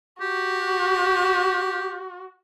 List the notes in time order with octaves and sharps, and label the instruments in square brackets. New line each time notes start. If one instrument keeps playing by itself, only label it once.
[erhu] F#4 [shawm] G4